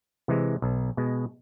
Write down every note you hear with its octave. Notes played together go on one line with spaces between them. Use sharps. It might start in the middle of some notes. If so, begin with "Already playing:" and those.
C3 E3 G#3
B1
B2 G#3